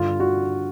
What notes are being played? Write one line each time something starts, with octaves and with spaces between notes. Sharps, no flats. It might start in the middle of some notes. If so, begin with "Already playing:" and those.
Already playing: G2 D3 F4
F#4